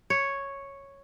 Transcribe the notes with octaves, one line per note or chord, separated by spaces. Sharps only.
C#5